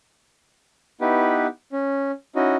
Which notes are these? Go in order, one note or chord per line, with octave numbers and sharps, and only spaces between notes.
B3 D#4 E4 G4 B4
C#4
C#4 D#4 E4 F#4 D#5